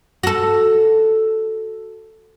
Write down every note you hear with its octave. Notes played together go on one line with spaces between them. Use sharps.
F#4 A4